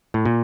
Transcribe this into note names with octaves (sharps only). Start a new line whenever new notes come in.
A2
A#2